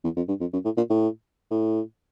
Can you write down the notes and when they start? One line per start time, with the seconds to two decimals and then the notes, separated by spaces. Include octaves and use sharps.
0.04 E2
0.17 F2
0.29 G2
0.41 F2
0.53 F#2
0.65 A2
0.77 A#2
0.90 A2
1.51 A2